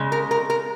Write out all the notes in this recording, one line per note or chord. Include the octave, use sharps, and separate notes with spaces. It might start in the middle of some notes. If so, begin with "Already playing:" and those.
Already playing: C#3 G#3
A#4
A#4
A#4